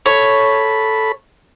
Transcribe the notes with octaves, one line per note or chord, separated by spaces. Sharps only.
A4 C#5 B5